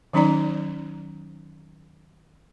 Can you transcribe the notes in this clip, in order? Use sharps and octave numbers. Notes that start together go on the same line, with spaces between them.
D#3 F#3 C#4 D#4 D5 A#5